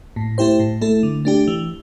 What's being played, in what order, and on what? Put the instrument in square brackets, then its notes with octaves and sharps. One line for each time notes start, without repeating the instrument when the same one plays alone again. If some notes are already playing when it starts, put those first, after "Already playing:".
[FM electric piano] A2
A3 E4 G4 C5
A2
A3 E4 A4
D3
A3 D4 G4
E3